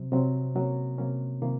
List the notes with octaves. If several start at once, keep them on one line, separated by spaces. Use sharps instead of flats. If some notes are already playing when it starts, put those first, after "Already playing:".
Already playing: C3 F#3 C4
C3 F#3 C4
C3 F#3 A#3 C#4
C3 F#3 A#3 C#4
C3 D#3 A#3 F4